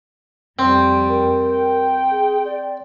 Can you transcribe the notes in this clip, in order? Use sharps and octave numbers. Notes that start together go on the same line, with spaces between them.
F2 G3 C4
A#4
G5
G#4
D5